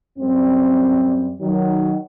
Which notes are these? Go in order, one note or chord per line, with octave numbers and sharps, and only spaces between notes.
F#2 G3 C4
D#3 F#3